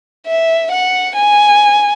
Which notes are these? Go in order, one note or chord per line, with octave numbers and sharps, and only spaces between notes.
E5
F#5
G#5